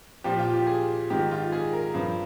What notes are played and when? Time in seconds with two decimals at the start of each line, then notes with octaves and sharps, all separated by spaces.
0.24 A#2 F3 G4
0.39 F4
0.53 G4
0.67 G#4
1.10 G#2 D#3 G4
1.31 F4
1.52 G#4
1.73 A#4
1.94 G2 F3